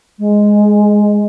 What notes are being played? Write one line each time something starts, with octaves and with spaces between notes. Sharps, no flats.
G#3